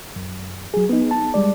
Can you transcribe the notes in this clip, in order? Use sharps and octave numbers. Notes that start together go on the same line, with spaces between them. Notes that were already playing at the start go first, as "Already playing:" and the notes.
F#2
F#3 G#4
B3 D#4
A5
G3 G#3 D5